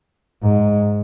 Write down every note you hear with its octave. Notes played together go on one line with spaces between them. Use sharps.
G#2